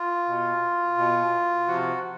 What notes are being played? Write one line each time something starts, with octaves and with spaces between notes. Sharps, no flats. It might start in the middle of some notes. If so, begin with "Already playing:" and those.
Already playing: F4
B2
B2
C3 F3 F#4